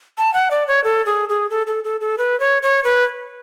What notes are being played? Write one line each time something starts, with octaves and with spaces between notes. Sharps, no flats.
A5
F#5
D5
C#5
A4
G#4
G#4
A4
A4
A4
A4
B4
C#5
C#5
B4